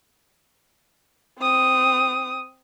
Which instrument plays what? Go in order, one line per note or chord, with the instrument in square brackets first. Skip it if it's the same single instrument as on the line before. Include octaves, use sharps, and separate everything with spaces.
[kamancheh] C4 D#6